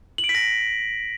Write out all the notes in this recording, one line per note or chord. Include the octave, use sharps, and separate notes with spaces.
F#7
D7
B6
A#6